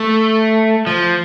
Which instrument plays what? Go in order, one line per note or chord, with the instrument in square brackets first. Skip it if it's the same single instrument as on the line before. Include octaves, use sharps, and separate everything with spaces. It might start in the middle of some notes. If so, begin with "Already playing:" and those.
Already playing: [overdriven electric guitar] A3
F3